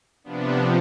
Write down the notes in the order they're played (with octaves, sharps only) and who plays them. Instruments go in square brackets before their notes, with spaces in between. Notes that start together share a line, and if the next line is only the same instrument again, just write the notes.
[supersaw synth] C3 F3 B3 D4